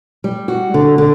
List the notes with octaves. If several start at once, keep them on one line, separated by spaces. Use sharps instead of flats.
G3
F#4
D3
D3